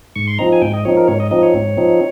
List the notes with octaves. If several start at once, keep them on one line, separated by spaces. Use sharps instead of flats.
G#2 C#6
C6
F3 C4 D#4 A#5
G#5
G#2 G5
D#5
F3 C4 D#4 C#5
A#4
G#2 C#5
D#5
F3 C4 D#4 D#5
C#5
G#2
F3 C4 D#4